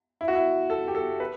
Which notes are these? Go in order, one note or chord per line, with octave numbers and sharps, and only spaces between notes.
E4
F#4
E4
A4
G4
A4
B4